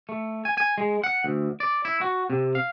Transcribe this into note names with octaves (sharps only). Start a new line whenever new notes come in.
A3
G#5
G#5
G#3
F#5
D2
D5
E4
F#4
C3
F5